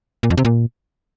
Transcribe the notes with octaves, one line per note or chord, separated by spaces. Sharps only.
A#2
F2
C3
A#2